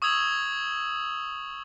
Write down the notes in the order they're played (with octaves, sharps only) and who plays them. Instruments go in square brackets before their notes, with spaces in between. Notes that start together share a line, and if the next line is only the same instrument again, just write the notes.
[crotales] C#6 D#6 E6 G#6 F7 F#7